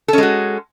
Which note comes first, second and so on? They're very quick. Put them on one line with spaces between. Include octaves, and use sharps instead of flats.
A4 C#4 G#3 F#4